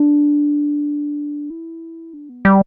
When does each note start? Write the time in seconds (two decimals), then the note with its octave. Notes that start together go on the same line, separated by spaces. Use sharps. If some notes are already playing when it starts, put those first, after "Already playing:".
Already playing: D4
1.50 E4
2.13 D4
2.29 B3
2.45 G3